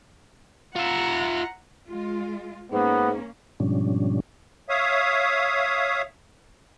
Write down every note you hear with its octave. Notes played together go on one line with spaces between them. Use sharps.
F4 E5 F#5 A#5
G#3 F4
G#2 A#3 B3 C#4
G#2 B2 F3 G3 C#4 D4
C#5 E5 F5 D#6